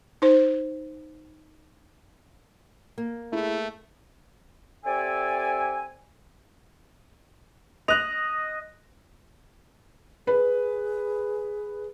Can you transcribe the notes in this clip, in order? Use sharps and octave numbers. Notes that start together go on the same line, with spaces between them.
D#4 C5
A#3
A3 E4 G#4
C4 G4 A4 D5 E5 G#5
D#5 F#6 F7
G#4 B4